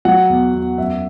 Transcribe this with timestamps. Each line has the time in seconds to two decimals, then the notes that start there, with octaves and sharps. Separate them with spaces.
0.05 F#3 F#5
0.30 E2
0.54 E2
0.78 F#2 E5